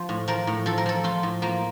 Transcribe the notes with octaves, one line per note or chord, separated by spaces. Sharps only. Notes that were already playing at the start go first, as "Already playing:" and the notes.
Already playing: F3 C5
A2
F3 A#4
A2
F3 A4
A#4
F3 A4
F3 F4
A2
F3 A#3